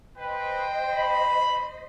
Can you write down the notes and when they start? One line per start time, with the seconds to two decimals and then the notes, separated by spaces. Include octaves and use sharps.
0.18 B4 C5 D#5 G5
0.95 B5